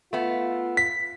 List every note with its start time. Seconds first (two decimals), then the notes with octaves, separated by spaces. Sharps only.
0.13 A3 B3 F4
0.77 B6